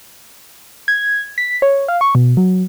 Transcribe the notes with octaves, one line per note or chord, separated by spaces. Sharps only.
G#6
B6
C#5
F5
C#6
B2
F#3